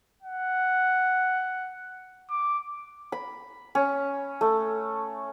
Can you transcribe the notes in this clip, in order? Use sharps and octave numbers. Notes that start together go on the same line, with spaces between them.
F#5
D6
B5
C#4
A3